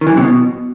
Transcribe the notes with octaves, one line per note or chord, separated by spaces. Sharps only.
D#3
E3
F#2
C3
B2